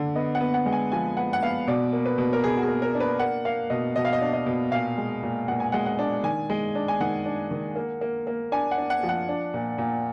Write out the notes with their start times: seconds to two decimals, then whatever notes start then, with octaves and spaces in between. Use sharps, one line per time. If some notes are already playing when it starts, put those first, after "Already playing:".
Already playing: D3
0.15 B3 D#5
0.35 F#5
0.40 B3
0.54 F#5
0.66 G#3
0.73 G#5
0.92 F3 G#5
1.17 B3 F#5
1.33 F#5
1.42 B3 F5
1.67 B2 D5
1.93 A#3
2.06 B4
2.18 B2
2.33 A#4
2.44 B2 G#4
2.57 F#4
2.63 G#4
2.69 A#3
2.82 A#4
2.95 D4
3.00 B4
3.20 A#3 F#5
3.45 A#3 F5
3.70 B2 D#5
3.96 B2 D#5
4.05 F5
4.13 D#5
4.21 D4
4.33 D#5
4.46 B2
4.72 A#2 F5
4.98 G#3
5.23 A#2
5.48 A#2 F#5
5.60 G#5
5.72 G#3 F#5
5.86 F#5
5.99 D4
6.23 D#3 G#5
6.50 G#3
6.75 D4
6.88 G#5
7.00 D#3 F#5
7.26 D4
7.51 D#3
7.76 A#3
8.01 A#3
8.27 A#3
8.52 D4 G#5
8.71 F#5
8.78 D4
8.90 F#5
9.03 F3
9.09 F#5
9.29 D4
9.54 A#2
9.78 A#2